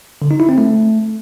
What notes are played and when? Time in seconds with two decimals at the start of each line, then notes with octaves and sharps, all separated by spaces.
0.22 D3
0.31 D#4
0.40 E4
0.49 C4
0.58 A3